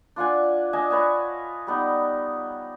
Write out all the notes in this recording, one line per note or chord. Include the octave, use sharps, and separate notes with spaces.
D4 F4 F#5 G#5
D4 D#5 G#5 A5
B4 C#5 G#5 A5
G3 B3 D#4